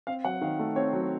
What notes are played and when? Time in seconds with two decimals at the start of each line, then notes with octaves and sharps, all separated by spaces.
0.07 C4 F5
0.25 F#3 F#5
0.41 D#3 F5
0.59 A3
0.76 C4 C#5
0.93 F#3